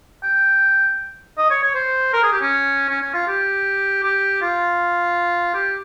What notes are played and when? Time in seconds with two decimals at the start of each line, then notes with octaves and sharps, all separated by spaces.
0.23 G5
1.37 D#5
1.50 C#5
1.63 C#5
1.75 C5
2.13 A#4
2.23 G#4
2.32 G4
2.41 C#4
2.89 C#4
3.01 C#4
3.14 F4
3.27 G4
4.03 G4
4.41 F4
5.54 G4